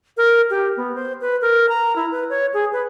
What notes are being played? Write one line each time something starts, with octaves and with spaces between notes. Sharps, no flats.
A#4
G4
B3
C5
B4
A#4
A#5
E4
B4
C#5
G#4
B4